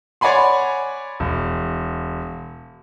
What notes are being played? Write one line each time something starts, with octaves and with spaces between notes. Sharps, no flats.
C#5 D5 F#5 G#5 B5 C6
E1